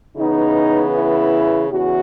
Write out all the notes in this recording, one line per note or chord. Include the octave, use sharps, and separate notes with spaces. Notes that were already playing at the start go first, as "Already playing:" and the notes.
C#3 E3 B3 D#4
E4
E2 C#3 E3 F#4